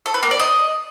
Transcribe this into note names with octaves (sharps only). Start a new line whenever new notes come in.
A4
B4
A#3
D5
D#5